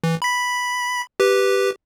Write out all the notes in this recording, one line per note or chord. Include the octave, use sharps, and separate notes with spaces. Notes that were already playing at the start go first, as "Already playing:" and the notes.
E3
B5 B6
G4 B4